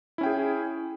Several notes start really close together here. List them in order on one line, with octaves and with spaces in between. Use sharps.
E4 C#4 G5 G#4